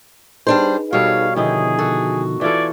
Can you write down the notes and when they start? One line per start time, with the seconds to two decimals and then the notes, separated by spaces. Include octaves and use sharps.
0.47 G3 D4 D#4 G#4 B4 C5
0.93 B2 G3 A4 C#5 F5
1.36 B2 D3 D#3 F3 D#4 E4 G#4
1.79 F#4 A4
2.41 E3 F4 A4 D5 G#6